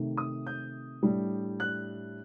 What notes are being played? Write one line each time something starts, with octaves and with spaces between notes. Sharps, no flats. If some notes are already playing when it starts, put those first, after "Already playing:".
Already playing: C3 D#3 A3
D#6
G6
A2 G3 D4
F#6